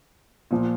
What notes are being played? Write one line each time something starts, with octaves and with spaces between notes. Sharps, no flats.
A#2 F3